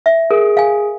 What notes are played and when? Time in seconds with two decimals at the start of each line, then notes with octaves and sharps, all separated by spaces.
0.06 E5
0.31 G#4 A#4
0.57 F5 G#5